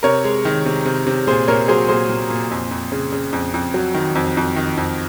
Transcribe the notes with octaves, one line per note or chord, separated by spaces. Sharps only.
C3 A#4 C#5
G#3
D#3
C3
C3
C3
A#2 G#4 C5
A#2 A#4 C#5
F#3 G#4 C5
A#2 G#4 C5
A#2
A#2
F2
F2
C#3
C#3
F2
F2
F#3
D#3
F2
F2
D#3
F2